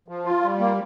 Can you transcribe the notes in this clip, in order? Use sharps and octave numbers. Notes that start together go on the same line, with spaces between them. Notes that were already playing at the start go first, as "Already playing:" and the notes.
F3
F4
G3
A#3